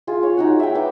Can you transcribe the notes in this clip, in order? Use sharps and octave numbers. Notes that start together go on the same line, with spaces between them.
F4 G#4
C#5
D#4 F#4 F#5
E5 G5
B4 D6